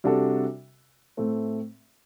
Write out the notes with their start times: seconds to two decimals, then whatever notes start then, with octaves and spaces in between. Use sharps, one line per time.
0.04 C3 G3 D4 F#4 A4
1.17 A2 A3 C4